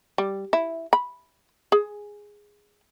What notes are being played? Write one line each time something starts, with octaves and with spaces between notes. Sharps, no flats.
G3
E4
B5
G#4